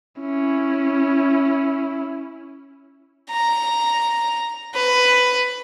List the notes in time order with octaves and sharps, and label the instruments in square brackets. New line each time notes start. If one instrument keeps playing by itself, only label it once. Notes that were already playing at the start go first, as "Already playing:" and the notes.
[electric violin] C#4 E4
[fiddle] A#5
B4